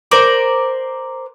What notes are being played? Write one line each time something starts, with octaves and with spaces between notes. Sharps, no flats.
A#4 C5 D5